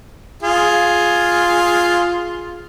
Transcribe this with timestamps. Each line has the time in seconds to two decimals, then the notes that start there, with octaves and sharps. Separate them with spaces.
0.42 F4 G#4